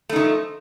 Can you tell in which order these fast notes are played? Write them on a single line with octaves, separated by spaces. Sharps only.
A3 D#4 D#3 F3